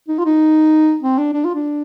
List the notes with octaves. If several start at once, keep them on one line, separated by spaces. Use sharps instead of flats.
D#4
F4
D#4
C4
D4
D4
F4
D4